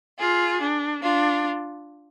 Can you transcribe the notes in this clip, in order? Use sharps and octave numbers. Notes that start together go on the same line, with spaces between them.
F4 G#4
D4
D4 F4